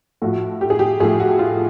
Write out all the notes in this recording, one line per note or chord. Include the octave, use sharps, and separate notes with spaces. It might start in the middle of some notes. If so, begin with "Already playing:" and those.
A2 F3 A3 F#4
G4
G#4
G4
A2 F3 A3 G#4
F#4
F4